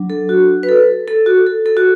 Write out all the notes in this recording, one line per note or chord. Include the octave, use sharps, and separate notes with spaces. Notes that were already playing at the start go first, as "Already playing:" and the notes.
Already playing: F#3 D4
A4
F#4
B4
A4
A4
F#4
A4
A4
F#4